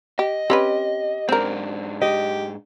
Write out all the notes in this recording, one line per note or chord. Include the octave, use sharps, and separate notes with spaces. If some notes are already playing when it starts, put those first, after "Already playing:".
G4 D#5
C4 C#4 G4 B4
G#2 C4 D4 A#4
G4 D#5